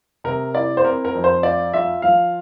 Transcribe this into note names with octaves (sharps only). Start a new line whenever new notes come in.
C3 A#4
E4 D5
C5
C4 A#4
A#4
F2
C5
F4 D5
F4 E5
F3 F5